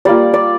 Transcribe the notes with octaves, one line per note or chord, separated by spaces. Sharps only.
G3 A#3 F4 D5
D5